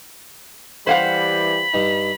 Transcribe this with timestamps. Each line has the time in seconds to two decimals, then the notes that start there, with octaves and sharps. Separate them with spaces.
0.87 E3 G3 C5 F5 F#5 B5
1.74 G2 D#4